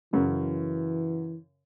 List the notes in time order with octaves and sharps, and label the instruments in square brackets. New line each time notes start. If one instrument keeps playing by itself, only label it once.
[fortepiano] F#2 C#3 [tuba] E3